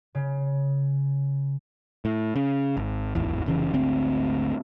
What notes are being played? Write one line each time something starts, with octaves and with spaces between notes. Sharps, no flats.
C#3
A2
C#3
G#1
D1 G#1 E2 E3
F1 C#3 E3
G#1 D2 D3 C4